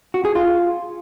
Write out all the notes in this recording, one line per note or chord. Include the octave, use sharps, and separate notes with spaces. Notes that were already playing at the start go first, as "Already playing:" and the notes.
F#4
G#4
F4